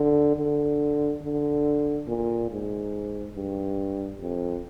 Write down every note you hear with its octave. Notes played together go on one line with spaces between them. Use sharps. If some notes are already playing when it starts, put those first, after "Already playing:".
Already playing: D3
D3
D3
A#2
G#2
G2
F2